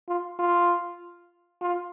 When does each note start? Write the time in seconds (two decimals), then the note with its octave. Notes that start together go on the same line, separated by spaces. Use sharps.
0.08 F4
0.39 F4
1.61 F4